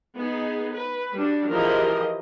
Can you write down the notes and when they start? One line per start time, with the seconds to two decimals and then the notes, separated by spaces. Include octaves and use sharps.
0.17 B3 D#4 G#4
0.73 B4
1.16 G3 D4 F#4
1.50 E3 F3 G4 G#4 A#4 D#5